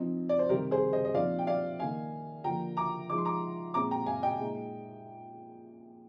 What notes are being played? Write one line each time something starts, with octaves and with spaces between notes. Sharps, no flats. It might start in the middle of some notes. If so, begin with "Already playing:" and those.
Already playing: F3 C4 D#4
D5
C5
C3 D#3 G3 C4 G4 A#4
G#4 C5
C5 D#5
D#5
A#2 F3 C4 D#4 D5 F5
G5
D5 F5
D#3 A#3 D#4 F5 G#5
D3 F3 A#3 G5 A#5
A#5 D6
F3 G#3 D#4 D6
C6
A#5 D6
A#2 G#3 C4 A#5 D6
G5 A#5
F5 G#5
D#5 G5
A#2 G#3 D#4